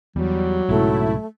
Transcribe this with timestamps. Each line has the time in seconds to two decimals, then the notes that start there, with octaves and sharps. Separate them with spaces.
0.16 E2 F#3 G3
0.69 B1 G#2 C#3 A3 E4